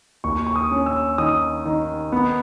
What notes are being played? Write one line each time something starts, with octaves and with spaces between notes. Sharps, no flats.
D#2 C#6
C#6
D#6
C#4
E6
D#3 D#6
D#3
B3